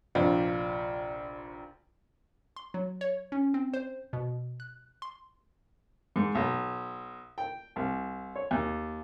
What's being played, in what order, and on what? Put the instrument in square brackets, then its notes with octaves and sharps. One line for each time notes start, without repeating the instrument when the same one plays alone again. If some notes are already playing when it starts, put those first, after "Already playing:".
[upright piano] F1 A#1 F4
[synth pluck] C6
F#3
C#5
C#4
C4
C5
B2
F#6
C6
[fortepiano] G#2
B1
G5
C2
C#5
D#2